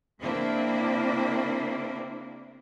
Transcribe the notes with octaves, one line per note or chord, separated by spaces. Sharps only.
C#3 A#3 C4 D4 E4